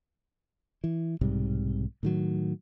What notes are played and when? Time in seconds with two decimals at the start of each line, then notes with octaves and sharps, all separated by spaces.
0.84 E3
1.21 B1 G#2 C3 G3
2.03 A2 D#3 F#3